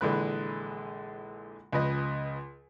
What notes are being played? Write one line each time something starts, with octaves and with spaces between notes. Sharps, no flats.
A#1 D3 E3 G#3 B4 F#6
C#2 F3 B4 D#5